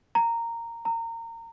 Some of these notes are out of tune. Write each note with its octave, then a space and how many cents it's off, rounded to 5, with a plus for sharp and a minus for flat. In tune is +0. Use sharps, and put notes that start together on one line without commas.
A#5 -10
A#5 -25